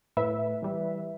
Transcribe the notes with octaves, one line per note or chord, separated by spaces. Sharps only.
A2 B4 E5
E3 G3